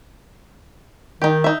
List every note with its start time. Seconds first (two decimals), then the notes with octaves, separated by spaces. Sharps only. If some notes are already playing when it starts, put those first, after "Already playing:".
1.22 D#3 D#4 G4
1.44 D#4 E5